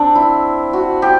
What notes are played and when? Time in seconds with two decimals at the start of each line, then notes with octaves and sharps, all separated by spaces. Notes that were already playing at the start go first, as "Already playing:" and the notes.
Already playing: C4 D4
0.15 E4
0.73 F#4
1.02 G4